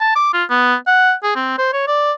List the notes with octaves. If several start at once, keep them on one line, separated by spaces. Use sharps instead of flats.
A5
D6
F4
B3
F#5
G#4
C4
C5
C#5
D5